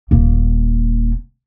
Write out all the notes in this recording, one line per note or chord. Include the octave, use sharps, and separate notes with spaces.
D#1 A#3